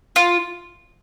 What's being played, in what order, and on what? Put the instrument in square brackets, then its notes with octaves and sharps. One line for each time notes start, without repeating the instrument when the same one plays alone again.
[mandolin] F4